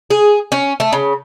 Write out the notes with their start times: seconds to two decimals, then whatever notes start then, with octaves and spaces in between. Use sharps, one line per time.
0.10 G#4
0.52 C#4
0.80 A3
0.92 C#3